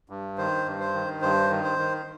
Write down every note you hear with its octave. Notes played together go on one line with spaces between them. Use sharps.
G2
D#3 C5
G2
C5
D#3
G2 C5
D#3
C5
D#3